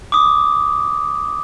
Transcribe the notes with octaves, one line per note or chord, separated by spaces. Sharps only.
D6 D#6